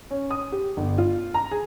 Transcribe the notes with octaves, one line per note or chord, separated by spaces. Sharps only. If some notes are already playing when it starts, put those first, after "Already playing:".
C#4
D#6
G4
G1
F4
A#5
G#4